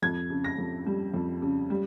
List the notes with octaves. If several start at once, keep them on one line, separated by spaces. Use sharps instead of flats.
F2 G#6
C#3
A#6
F2
G3
F2
C#3
G3